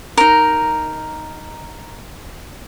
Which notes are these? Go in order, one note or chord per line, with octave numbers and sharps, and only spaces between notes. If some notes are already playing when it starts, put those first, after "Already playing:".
D#4 A#4